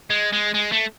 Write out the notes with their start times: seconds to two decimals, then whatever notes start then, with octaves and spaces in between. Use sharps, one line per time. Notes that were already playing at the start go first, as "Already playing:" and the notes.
0.10 G#3
0.33 G#3
0.55 G#3
0.72 A3